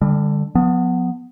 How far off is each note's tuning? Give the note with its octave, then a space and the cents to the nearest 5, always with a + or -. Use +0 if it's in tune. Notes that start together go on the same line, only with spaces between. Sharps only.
D3 +0 G3 +35
F3 +40 B3 +0